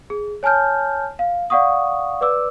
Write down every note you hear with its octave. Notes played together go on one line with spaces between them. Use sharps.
G#4
C#5 G#5 A5 F6 G6
F5
D5 F5 F#5 C#6 D#6
B4 D5 D6 E6